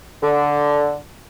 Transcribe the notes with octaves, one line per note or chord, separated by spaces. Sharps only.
D3